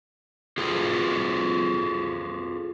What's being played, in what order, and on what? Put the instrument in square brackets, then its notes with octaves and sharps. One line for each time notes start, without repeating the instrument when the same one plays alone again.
[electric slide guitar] F4 G#4 A4